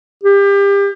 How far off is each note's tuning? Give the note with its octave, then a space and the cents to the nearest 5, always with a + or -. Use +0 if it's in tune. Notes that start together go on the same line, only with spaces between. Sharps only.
G4 +30